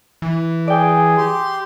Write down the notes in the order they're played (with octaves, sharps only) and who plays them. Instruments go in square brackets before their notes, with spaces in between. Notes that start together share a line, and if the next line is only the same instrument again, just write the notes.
[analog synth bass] E3
[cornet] G#4 [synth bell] D5 G5
[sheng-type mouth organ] G4 C6